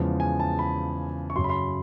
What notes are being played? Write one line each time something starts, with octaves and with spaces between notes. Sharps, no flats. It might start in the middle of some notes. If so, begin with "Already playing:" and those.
Already playing: E2 C#3 F3 G#3
G#5
A5
B5
C#6
F#2 C#3 F#3 C6
B5
C6